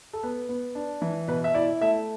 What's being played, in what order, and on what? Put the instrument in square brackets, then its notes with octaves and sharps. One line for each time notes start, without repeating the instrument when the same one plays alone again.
[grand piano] A4
B3 B4
B3
D4
E3
B2 B4
E5
E4 D5
A3 E5